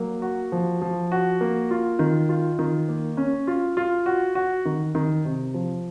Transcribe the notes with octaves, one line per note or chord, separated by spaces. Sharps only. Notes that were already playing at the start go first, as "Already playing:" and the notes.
Already playing: F#3 A#3
F#4
F3
F3
F#4
A#3
F4
D#3
F4
D#3
A#3
C#4
F4
F4
F#4
F#4
D#3
D#3
C3
F3